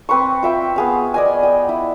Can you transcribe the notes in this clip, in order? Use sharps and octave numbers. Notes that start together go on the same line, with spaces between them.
C4 B4 C6 C#6
F4 E5 G5
B3 G#4 F5
D5 D#5 G#5
G5
E4